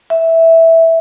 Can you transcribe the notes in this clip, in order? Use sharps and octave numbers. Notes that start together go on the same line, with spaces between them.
E5